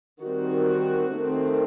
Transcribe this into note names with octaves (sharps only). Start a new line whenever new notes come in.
D#3 G3 C4 F#4
D#3 A3 C4